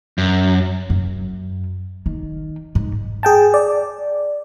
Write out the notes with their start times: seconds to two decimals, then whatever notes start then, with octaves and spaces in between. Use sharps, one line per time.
0.18 F#2
0.90 F#2
2.06 D#3
2.75 G#2
3.23 G#4 G5 A5
3.54 D5